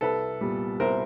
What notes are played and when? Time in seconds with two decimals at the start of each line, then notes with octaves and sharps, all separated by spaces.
0.01 C2 A4 B4
0.41 A#2 G3 B3
0.80 C2 A#4 C5